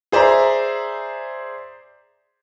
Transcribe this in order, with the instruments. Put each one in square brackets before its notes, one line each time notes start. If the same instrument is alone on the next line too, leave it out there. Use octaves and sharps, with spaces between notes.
[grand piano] G#4 C5 D5 E5 A#5